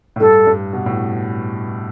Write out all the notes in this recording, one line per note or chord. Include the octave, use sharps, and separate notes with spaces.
A2
G2 A4
G2
B2
A2